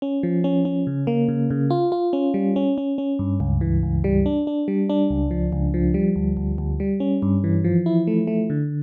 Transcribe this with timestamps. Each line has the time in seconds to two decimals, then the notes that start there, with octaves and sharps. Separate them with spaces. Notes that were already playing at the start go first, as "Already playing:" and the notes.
0.02 C#4
0.23 F3
0.44 C#4
0.65 C#4
0.87 C#3
1.07 A#3
1.28 C#3
1.50 C#3
1.70 F4
1.92 F4
2.13 C#4
2.34 G3
2.56 C#4
2.78 C#4
2.98 C#4
3.19 G2
3.40 C#2
3.61 E3
3.83 C#2
4.04 G3
4.26 D4
4.47 D4
4.68 G3
4.90 D4
5.10 C#2
5.31 F3
5.53 C#2
5.74 F3
5.94 G3
6.16 D2
6.37 D2
6.58 D2
6.80 G3
7.00 C#4
7.22 G2
7.44 E3
7.64 F3
7.86 E4
8.07 A3
8.27 A3
8.50 D3